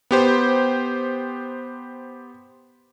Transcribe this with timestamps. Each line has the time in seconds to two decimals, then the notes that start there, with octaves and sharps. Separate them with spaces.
0.11 B3 G4 C5